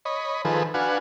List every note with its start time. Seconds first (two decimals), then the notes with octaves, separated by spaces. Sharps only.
0.05 C#5 D#5 B5
0.45 D#3 F3 G#4 A4 B4
0.74 D4 F#4 B4 F5 F#5 G#5